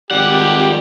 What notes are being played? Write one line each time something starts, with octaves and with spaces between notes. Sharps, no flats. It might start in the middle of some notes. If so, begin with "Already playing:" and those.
G#1 F2 G#2 G3 G4 F#5